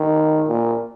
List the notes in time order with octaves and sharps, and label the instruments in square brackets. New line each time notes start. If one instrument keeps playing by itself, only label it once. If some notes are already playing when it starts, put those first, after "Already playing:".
Already playing: [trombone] D#3
A#2